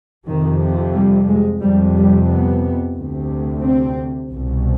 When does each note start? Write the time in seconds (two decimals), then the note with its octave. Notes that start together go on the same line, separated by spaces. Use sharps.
0.27 F2 C3 D#3
0.95 G3
1.28 G#3
1.62 F2 C3 G3
1.95 G3
2.29 B3
2.95 D2
3.01 C3
3.63 C4
4.30 C2 B2